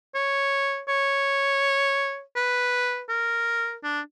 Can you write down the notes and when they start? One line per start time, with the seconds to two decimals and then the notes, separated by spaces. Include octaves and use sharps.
0.15 C#5
0.89 C#5
2.36 B4
3.09 A#4
3.84 D4